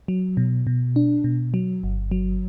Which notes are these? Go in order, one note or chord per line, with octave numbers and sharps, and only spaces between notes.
F#3
B2
B2
D4
B2
F#3
G1
F#3